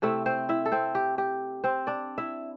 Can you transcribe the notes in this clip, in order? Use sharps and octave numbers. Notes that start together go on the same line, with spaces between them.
C3 A3 C4 E4 E5
C4 C5
E4 E5
A4
C4 C5
G4
G4
C4 C5
D4 D5
E4 E5